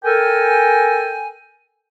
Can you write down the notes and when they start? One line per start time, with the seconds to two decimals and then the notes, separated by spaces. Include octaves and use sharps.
0.04 A4 A#4 G5 G#5